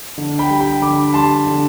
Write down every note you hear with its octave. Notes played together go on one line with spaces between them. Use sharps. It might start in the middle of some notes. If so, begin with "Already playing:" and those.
D3
G5 B5
G3
G5 B5
D3 B5 D6
G3 A5 C6
D3